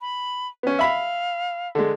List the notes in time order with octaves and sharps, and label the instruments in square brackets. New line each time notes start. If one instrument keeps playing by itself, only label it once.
[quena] B5
[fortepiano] B3 C#4
[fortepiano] E5 B5 [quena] F5
[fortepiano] D3 G#3